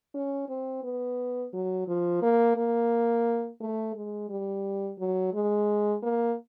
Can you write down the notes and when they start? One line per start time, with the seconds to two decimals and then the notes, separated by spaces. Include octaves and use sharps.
0.14 C#4
0.49 C4
0.84 B3
1.53 F#3
1.87 F3
2.22 A#3
2.57 A#3
3.61 A3
3.95 G#3
4.30 G3
4.99 F#3
5.34 G#3
6.03 A#3